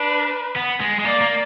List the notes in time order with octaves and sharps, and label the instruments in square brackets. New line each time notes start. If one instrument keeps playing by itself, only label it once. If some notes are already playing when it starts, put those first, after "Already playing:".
Already playing: [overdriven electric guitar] D4 [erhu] B4
[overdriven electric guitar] B3
G#3
G#3
[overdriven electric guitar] A#3 [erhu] D5
[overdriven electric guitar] A#3